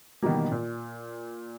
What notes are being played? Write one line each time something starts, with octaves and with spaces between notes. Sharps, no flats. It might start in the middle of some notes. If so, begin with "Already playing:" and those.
B2 D#3 E3 F#3 G3 A#3
A#2